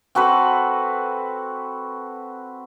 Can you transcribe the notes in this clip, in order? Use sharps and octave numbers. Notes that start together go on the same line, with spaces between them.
C4 F#4 A4 B4